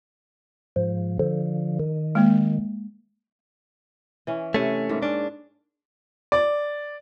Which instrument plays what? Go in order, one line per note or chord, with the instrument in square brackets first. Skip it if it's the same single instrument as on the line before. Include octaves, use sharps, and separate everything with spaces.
[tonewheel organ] G#2 F3
D3 F3
D#3
[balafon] G#3 A#3
[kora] E3 C#4
[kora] C3 B4 [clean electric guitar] A3 C#4
[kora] G#2 A#3 A#4
[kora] C#4 [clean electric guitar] D4
[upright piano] D5